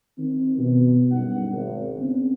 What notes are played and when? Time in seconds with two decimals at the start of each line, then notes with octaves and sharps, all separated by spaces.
0.18 D#3 C4
0.58 B2
1.11 F#1 G2 F#3 D#4 F#5
1.53 G#1
1.98 C#3 B3 C4